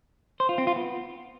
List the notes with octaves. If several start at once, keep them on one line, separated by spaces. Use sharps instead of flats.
C5
F4
C4
F4
B3